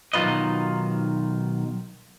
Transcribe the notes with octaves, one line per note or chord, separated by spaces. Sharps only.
B1 D#3 F#3 F4 B4 D#5